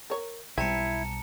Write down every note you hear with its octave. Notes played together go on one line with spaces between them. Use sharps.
A#4 C#5
B1 G3 C4 E4 A5 A#5 C#7